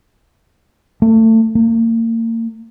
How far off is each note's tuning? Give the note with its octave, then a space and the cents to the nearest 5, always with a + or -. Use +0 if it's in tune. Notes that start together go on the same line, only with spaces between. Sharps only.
A3 +25
A#3 -35